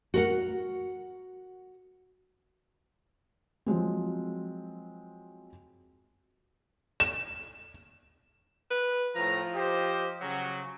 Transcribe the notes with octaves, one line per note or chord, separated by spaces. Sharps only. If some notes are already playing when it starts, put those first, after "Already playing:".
F#4 A#4 F#5
F3 F#3 G#3 C4
E7
B4
A2 F3 A#5
G4 C5 D#5
C#3 F#3